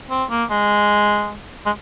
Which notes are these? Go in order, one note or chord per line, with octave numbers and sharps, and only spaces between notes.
C4
A#3
G#3
G#3